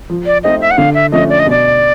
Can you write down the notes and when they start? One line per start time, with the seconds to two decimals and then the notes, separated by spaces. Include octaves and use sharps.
0.10 F3
0.26 D5
0.43 A3 C4 D#4 D#5
0.61 E5
0.71 F#5
0.78 D3 F5
0.94 E5
1.12 F3 A3 C#4 D#5
1.29 D5
1.39 D#5
1.46 B2 D5